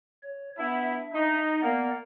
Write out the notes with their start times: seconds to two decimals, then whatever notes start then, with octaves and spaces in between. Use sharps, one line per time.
0.23 C#5
0.58 B3 D4 E4 E5
1.12 D#4
1.62 A#3 B3 D5 F#5